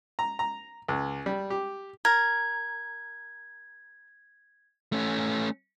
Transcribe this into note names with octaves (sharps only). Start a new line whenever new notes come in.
A#5
A#5
C#2
G3
G4
A#4 G#6
A3 C#4